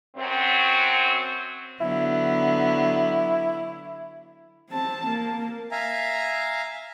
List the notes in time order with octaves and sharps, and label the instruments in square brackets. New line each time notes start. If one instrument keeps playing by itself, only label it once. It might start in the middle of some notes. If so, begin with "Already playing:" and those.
[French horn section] F#2 F#3 C4
[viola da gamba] D3 F#3 B3 [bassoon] E4
[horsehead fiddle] C4 A5
A#3
[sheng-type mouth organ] E5 F5 G#5 A#5